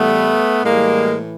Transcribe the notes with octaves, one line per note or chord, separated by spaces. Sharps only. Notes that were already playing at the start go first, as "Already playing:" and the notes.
Already playing: A2 E3 G3 A3 B3
A2 E3 G3 G#3 A#3